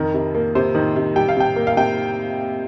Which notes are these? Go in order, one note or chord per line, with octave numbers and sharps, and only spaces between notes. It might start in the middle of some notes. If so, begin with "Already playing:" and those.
Already playing: F2 D#3 A#4
C3
A#3
C3 C5
D#3
C3
G3 G5
F5
C3 G5
A#3
F5
C3 G5